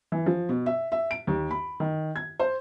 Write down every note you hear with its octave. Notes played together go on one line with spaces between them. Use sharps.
E3
F3
B2
E5
E5
D7
D#2
B5
D#3
G#6
C5